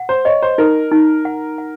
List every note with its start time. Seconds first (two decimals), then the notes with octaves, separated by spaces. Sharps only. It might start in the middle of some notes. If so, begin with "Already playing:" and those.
Already playing: F#5
0.09 C5
0.25 C#5 D#5
0.42 C5
0.58 D#4 A#4
0.92 D#4
1.25 F#5
1.58 F#5